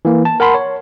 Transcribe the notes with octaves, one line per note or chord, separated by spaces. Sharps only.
E3 A#3
A5
A#4 F#5 A5 B5 C6
C#5